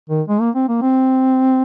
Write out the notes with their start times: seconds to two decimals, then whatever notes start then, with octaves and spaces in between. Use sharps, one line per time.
0.10 D#3
0.28 G#3
0.41 A#3
0.55 C4
0.69 A#3
0.82 C4